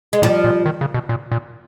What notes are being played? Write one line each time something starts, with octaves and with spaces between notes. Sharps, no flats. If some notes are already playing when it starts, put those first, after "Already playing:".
G#3
A2 F3 G3
A#2
D#3
C#3
B2
A#2
A#2